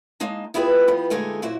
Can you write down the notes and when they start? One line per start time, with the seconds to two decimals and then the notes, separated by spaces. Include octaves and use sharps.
0.20 G#3 A#3 D#4 A5
0.54 B3 E4 F4 G4 G#4 B4
0.87 F3 G3 B3
1.10 A#2 D3 G#3 A3 D#4 G#4
1.42 F#2 A#2 E4 F#4 C5